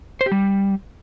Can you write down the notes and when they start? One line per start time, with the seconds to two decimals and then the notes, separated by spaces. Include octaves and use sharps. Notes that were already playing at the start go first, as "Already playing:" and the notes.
0.21 C5
0.26 G4
0.32 G3